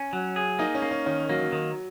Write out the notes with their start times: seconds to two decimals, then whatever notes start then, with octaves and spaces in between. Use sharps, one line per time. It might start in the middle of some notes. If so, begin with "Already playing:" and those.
Already playing: C#4
0.13 F#3
0.36 G#4
0.59 A#3 D#4
0.75 C#4
0.82 A#3
0.91 C#4
1.06 D#3 C#4
1.29 F#3 A#3
1.41 F#3
1.52 D#3